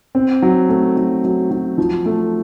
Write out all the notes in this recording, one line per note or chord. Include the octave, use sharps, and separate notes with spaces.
C4
F#3
A3
F#3
F#3
F#3
F3
A3